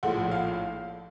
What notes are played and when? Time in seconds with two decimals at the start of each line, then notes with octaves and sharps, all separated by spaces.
0.03 A#1 A2 F3 F#5
0.31 F5